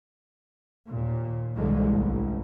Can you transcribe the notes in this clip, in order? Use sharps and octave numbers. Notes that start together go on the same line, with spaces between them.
D#2 A#2
C2 G#2 D3 E3 G#3 A#3
A1